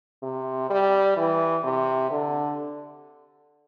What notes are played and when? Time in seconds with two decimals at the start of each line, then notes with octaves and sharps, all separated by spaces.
0.23 C3
0.70 G3
1.17 E3
1.64 C3
2.11 D3